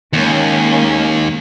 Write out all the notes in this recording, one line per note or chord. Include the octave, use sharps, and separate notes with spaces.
D#2 G#3 A#3 C#4